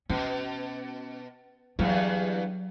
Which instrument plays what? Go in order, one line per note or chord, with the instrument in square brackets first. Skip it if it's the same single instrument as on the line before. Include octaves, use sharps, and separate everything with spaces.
[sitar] B2 [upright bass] C#4
[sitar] E2 G2 [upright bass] F#3